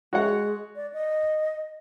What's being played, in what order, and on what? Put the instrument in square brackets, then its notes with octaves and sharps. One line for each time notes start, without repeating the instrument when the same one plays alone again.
[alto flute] G#3 [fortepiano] F#4 C#5 F#5
[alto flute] D5
D#5